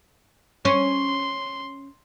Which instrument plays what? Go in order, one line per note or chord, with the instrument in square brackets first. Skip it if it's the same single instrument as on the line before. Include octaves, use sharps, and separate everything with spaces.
[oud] C#4 [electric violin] C6